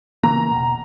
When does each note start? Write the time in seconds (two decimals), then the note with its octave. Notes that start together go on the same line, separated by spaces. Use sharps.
0.23 C#3 E3 A#3 A#5
0.51 E1 B2